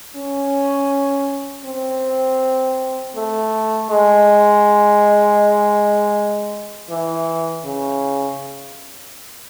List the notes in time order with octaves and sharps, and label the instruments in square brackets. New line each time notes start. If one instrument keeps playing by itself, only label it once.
[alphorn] C#4
C4
A3
G#3
E3
C#3